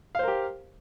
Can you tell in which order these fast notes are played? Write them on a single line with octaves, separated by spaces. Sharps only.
F5 C5 A#4 G4